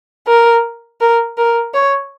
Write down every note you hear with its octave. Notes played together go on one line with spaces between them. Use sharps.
A#4
A#4
A#4
C#5